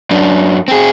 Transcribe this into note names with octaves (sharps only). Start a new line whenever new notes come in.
F#2 D4
C4 G#4